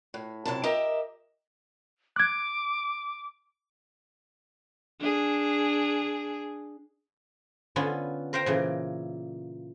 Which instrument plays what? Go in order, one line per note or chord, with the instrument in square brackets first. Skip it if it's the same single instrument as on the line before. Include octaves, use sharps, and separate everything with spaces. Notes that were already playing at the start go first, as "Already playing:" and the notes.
[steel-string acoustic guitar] A2
F#2 C3 E4 A5
G4 A#4 D#5 E5
[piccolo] D6 [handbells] F#6 G#6
[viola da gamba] D4 G#4
[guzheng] D3 B3 C#4 F4
A#4 C5 F5 G5 A#5
A#2 C#3 E3